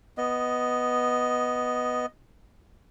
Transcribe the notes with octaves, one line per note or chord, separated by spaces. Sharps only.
B3 D#5